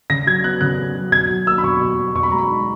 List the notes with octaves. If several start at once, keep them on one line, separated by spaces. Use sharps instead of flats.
C#3 A#6
F#3 G#6
B3 F#6
C#3 F#6
C#3
F#3
B2 G#6
F#3
A#3 E6
B5
B2 C#6
B2
F#3
B2 C#6
B5
G#3 A#5
B5
D#4